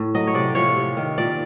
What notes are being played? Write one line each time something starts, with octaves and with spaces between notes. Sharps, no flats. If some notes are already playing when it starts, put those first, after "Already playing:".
Already playing: A2
F#3 D#5
C#5
C3 D5
F3 C#5
C3
D#3
A#2 D5